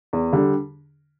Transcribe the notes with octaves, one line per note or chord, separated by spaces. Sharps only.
E2
D3 G3